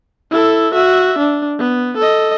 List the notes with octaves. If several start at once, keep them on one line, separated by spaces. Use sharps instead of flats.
E4 A4
F#4 E5
D4
B3
A4 D#5